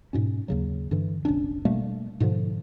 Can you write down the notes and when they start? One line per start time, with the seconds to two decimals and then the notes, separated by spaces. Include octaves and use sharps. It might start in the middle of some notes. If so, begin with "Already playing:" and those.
0.13 G#2 B2 C#4
0.48 D#2 C#3 F#3
0.91 G2 D3 E3
1.25 F1 A#1 C#4 D4
1.65 B2 G3 A3 A#3
2.20 G#2 B2 D3 F3